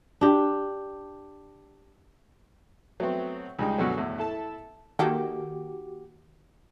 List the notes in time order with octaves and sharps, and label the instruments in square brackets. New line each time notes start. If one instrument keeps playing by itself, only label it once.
[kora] D4 G4
[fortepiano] F#3 A3 B3 C4
C#2 G3 G#3 D#4 G4
F#2 B2 D3 F#3
E2 A2
E4 A4 A5
[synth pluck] D#3 A#3 [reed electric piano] F#4 G4 D6 [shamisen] A4 G5